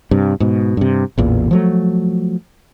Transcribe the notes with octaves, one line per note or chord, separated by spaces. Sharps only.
G2 C3
G#2 B2
G2 C3
A1 E2 A#2
F3 F#3 A3